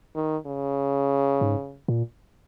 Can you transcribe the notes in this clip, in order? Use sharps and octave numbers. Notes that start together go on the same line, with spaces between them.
D#3
C#3
G#2
A#2